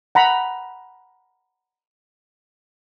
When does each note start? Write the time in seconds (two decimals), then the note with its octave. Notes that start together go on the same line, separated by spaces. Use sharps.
0.15 F#5 A#5 B5